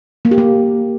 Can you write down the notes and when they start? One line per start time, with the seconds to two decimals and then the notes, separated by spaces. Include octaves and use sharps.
0.25 A#3
0.31 G4
0.38 A#3